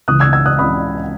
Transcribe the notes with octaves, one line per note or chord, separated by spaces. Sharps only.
C#2 C#3 E3 D#6 F#6
E6 G#6
E6 G#6
D#6 F#6
C#2 C#3 E3 B5 D#6